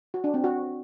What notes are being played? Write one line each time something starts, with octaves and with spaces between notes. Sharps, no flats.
F#4
D4
C4
F#4